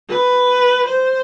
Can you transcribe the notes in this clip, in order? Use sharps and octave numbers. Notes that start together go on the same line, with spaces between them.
B4
C5